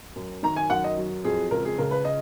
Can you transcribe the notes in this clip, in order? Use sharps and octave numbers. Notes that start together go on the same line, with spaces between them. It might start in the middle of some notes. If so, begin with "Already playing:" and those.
F#2
D#3 A#5
G#5
F#2 F#5
D#5
F#3
F2 G#4
C#2 A#4
G#4
C#3 A#4
B4
D#5